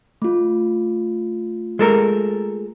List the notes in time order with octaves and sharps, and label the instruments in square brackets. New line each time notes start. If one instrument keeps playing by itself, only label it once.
[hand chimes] A3 F4
[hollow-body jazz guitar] G#3 A4 A#4